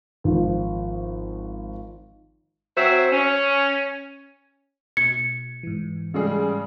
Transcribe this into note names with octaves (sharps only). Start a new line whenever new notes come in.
G#1 F3
F#3 C4 C5 E5
C#4
B2 G#6 C#7
G#2 E3
C#3 G3 G#3 G#4